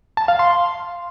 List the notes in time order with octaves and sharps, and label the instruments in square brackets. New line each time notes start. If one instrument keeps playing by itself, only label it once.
[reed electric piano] A5
F5
C6